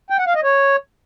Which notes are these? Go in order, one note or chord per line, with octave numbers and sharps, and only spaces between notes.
G5
F#5
F5
D#5
C#5